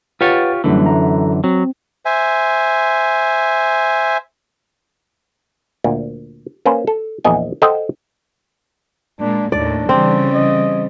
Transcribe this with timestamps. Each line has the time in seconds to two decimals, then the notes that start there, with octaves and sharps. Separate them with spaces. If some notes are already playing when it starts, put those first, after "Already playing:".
0.21 F4 G4 B4 C#5 F#5 A6
0.64 F#2 D3 E3 G3 A#3
0.86 A4 E5 A#5
1.44 F#3 C4
2.05 C5 E5 G#5
5.84 D2 A#2
6.65 A#3 C#4 B4 C5
6.87 A4
7.25 A#1 E2 D#5 G#5
7.62 A4 C5 D#5 F#5 G5 A5
9.19 A#2 G#3 D4
9.52 D#2 A2 D4 D5
9.89 C#3 E3 G3 C4
10.34 D#5